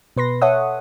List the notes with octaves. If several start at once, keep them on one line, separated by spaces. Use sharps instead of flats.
B2 B4 C6 A#6
A4 C#5 E5 F#5 D#6